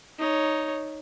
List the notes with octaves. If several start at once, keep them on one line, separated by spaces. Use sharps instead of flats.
D#4 C#5